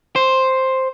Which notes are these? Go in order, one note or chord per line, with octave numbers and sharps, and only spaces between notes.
C5